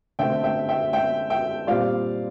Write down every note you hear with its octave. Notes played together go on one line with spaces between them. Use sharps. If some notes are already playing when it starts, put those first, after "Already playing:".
D3 A3 C4 E5 G5
E5 G5
E5 G5
E5 G5
E5 G5
A#2 G3 C4 D5 F5